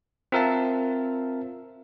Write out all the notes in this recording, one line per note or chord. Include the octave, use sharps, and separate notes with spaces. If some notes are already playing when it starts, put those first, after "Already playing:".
C4 F4 A#4 E5 F5 A5